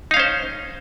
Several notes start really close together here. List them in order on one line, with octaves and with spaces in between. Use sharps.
D#4 F5 C#4 C5